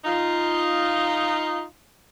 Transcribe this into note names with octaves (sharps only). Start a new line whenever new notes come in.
D#4 F4